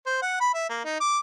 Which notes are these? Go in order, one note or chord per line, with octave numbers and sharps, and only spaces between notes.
C5
F#5
B5
E5
A#3
D#4
D6